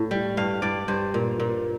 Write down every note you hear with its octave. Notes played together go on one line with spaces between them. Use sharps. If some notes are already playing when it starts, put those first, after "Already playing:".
Already playing: A2
G3
G2 F5
G2 D5
G2 C5
A#2
A#2